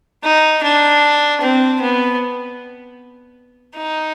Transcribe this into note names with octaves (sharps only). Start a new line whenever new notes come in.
D#4
D4
C4
B3
D#4